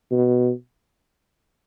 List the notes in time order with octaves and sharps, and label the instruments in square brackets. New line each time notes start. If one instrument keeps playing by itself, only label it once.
[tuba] B2